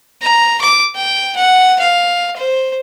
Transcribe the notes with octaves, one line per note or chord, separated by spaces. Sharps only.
A#5
D6
G5
F#5
F5
C5